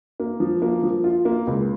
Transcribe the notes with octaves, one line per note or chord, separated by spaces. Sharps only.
A#3
F3
A#3
F3
F4
A#3
C#2